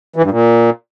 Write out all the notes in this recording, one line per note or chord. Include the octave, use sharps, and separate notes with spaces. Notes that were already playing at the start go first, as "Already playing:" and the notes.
E3
G2
A#2